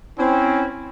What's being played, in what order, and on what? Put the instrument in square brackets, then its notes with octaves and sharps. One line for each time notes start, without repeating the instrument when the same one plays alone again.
[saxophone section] C4 [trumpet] C#4 [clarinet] E4